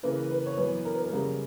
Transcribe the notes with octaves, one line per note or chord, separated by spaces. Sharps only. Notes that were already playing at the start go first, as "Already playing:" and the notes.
C#3 E3 A#3 C#4 B4
B4
C#5
F#2 E3 B3 B4
A#4
B4
A#4
F#2 C#3 G3 A#3 C#4